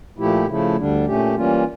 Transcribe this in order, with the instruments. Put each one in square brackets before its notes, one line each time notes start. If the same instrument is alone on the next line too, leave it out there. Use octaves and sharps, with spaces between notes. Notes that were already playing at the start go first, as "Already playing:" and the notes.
[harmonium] A#2 F3 A3 E4 G4
C#3 F3 A3 E4
D2 D3 G3 D4
A#2 A3 C#4 G4
E3 G3 A#3 C#4 F4